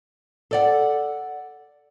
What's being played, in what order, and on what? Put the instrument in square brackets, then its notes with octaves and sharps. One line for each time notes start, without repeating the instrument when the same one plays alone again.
[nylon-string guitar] A4 D5 F#5